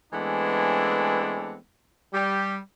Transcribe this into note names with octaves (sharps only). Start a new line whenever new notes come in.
E3 G#3 A3 B3 C4 D4
G3 G4